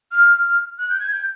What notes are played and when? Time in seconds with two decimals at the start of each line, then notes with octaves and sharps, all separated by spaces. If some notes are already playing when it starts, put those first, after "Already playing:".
0.11 F6
0.78 F#6
0.89 G6
1.00 G#6
1.11 G6